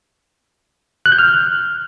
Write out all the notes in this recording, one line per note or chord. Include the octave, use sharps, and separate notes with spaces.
F#6
G6
F6